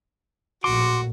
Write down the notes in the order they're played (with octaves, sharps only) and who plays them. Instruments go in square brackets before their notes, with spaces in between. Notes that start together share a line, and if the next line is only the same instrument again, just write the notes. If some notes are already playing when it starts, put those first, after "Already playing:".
[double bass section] A#1 A2 [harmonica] F#4 [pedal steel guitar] C6 D6